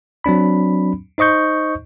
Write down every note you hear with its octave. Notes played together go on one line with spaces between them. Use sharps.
F#3 C4 D4 B5
D#4 C5 D#5 C#6 G6